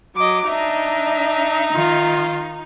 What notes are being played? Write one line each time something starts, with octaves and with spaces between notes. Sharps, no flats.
F#3 D#5 D6
D4 D#4 D#5 E5
D#3 F4